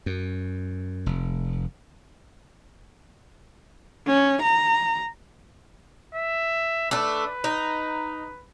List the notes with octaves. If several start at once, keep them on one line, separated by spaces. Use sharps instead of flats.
F#2
F1
C#4
A#5
E5
A3 D4 B4
D#4